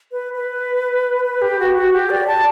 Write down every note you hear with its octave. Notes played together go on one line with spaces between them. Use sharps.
B4
B4
B4
G4
F#4
F#4
G4
D5
A5